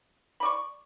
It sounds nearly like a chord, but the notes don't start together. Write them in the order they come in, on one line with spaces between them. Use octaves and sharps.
B5 D5 C#6